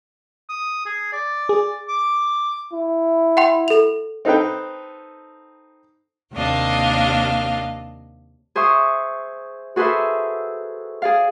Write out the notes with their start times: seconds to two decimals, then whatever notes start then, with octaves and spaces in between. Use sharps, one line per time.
0.50 D#6
0.86 G#4
1.13 D5
1.49 G#4
1.88 D6
2.73 E4
3.37 F#5 G5 C6
3.68 A4 F7
4.25 C4 D#4 A4 B4 G5
6.33 D#2 C3 A#3 D4 D#5 F5
8.55 G#4 C5 E5 C#6 D#6
9.76 F#4 G#4 A4 B4 C5 E5
11.02 G#4 D5 F5